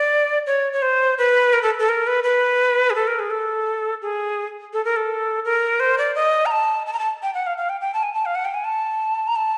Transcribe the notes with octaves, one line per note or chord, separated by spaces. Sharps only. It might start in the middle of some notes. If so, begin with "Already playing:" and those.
Already playing: D5
C#5
C#5
C5
B4
A#4
A4
A4
A#4
B4
B4
G#4
A4
A#4
G#4
A4
G#4
A4
A#4
A4
A#4
C5
D5
D#5
A#5
A5
A5
A#5
A5
G5
F#5
F5
F5
G5
G5
A5
G#5
A5
F5
F#5
G5
G#5
A5
A#5
A5